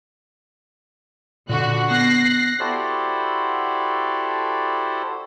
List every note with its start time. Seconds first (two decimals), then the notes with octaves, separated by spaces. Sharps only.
1.49 A#2 D3 F#4 F#6
1.91 B3 F#6 A#6 C7
2.60 E4 F#4 G4 A4 C5 D5